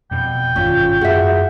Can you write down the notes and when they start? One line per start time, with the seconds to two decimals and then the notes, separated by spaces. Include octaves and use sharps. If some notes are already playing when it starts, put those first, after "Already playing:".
0.11 F2 B2 G5
0.56 G#1 G2 C#4 F4
1.01 F#2 F#4 G#4 E5